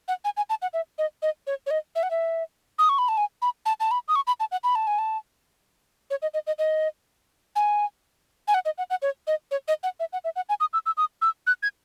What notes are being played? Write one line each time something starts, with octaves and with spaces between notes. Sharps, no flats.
F#5
G#5
G#5
A5
F#5
E5
D#5
D#5
C#5
C#5
D#5
E5
F#5
E5
D#6
C#6
B5
A5
G#5
B5
A5
A5
B5
D#6
C#6
B5
A5
F#5
B5
A5
G#5
A5
C#5
D#5
D#5
D#5
D#5
G#5
G#5
F#5
D#5
F#5
F#5
C#5
D#5
C#5
D#5
F#5
E5
F#5
E5
F#5
G#5
D#6
E6
E6
D#6
E6
F#6
G#6